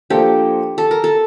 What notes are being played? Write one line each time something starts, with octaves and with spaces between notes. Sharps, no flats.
F3 A#3 D4 G4 A4 C5
A4
A#4
A4